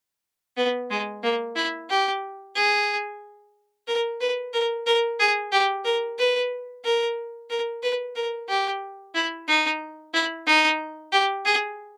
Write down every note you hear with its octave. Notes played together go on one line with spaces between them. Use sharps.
B3
G#3
A#3
E4
G4
G#4
A#4
B4
A#4
A#4
G#4
G4
A#4
B4
A#4
A#4
B4
A#4
G4
E4
D#4
E4
D#4
G4
G#4